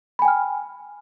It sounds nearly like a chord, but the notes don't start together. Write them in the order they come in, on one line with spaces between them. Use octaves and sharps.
B5 G#5 G5 F6